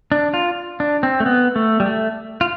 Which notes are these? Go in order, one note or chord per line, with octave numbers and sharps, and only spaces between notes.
D4
F4
D4
C4
A3
B3
A3
G3
A3
F4